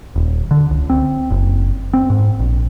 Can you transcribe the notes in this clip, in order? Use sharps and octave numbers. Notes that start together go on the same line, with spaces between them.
D#1
D3
C#2
C4
F#1
C4
G#2
A#1